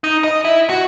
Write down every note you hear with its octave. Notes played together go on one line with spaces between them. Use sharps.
D#4
D#5
E4
F#4